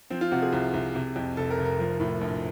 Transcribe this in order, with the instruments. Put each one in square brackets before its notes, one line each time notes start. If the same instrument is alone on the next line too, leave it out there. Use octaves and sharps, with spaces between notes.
[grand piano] F3 C4
F4
C3 F#4
G#4
C2
C2
C3
F2
F1 A4
A#4
F1
A#4
F3
A2
A#1